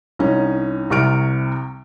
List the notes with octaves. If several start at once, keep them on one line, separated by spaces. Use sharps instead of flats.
C2 C#4 D#4
C2 C3 C#6 F6 D7